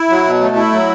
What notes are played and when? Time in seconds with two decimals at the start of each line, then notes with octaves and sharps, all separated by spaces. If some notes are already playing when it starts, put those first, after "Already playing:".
Already playing: E4
0.10 F#3
0.25 B2
0.40 A3
0.56 E4
0.72 F#3